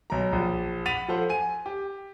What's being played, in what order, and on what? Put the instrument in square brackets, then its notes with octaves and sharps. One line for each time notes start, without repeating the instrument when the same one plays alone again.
[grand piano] B1 A#5
A#1
F#5 B5 A6 B6 D#7 F7
F3 A4 C5 F#5
G#5 D#7
G4